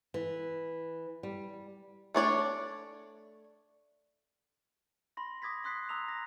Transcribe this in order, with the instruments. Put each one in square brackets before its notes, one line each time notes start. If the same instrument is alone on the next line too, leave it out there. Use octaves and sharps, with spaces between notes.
[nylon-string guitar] E3
G3
[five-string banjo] A3 D4 C#5 D5
[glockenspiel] B5 C6 A#6
D6 D#6 G#6 A#6 B6
C6 D#6 F#6 B6 C7
A#5 D#6 E6 F7
A#6